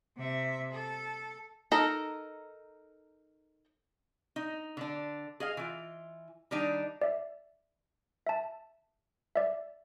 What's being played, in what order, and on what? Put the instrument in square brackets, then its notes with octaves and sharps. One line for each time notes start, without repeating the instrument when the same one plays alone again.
[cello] C3 E5
A4
[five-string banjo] D#4 A4 A#4 A#5
[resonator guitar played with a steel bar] D#4
D3 D4
G#4 D#5 F5
E3 F4
D#3 G3 D4 D#4
[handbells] D5 E5
E5 A5
D5 E5